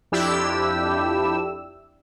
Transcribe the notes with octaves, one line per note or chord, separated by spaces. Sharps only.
F2 D4 E4 G4 E6